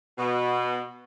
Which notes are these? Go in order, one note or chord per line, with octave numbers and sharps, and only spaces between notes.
B2